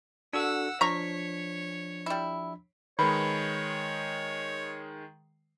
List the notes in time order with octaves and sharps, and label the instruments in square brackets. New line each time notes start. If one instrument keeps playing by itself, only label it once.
[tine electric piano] D4 F#4 A4 [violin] F#5 E6
[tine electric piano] F3 D4 B6 [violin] C#5 [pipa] A#5 C#6
[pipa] G3 E4
[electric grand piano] D#3 G#3 [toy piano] B4 B5 [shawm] C#5